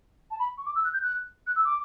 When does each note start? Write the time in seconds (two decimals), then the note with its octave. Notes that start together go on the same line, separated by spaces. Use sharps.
0.31 A5
0.39 B5
0.58 C#6
0.66 D6
0.75 E6
0.84 F#6
0.93 G6
1.02 F#6
1.47 F#6
1.56 E6
1.65 D6